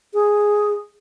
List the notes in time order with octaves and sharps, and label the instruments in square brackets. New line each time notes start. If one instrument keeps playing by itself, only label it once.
[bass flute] G#4